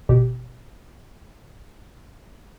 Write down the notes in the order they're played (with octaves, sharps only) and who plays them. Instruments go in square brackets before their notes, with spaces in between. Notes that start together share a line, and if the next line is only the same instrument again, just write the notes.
[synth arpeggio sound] G1 B2 G4